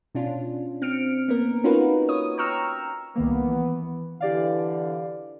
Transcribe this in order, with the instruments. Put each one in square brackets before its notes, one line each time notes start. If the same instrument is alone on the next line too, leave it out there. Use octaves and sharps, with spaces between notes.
[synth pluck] B2 C#4 D4 F4
C4 F6 C#7 D7
A#3 B3 A#4
C#4 D#4 F4 F#4 A#4 B4
C#5 D#6
G5 A#5 C#6 E6 F6
[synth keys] C2 D#3 A#3 [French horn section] B3
[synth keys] E3
[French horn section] D3 E3 [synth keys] G4 D5 F5